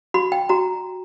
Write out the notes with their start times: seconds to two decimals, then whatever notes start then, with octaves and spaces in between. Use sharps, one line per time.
0.14 F#4 B5
0.32 G5
0.49 F#4 A#5